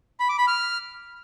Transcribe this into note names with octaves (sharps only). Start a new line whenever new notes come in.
B5
D6
B5
F6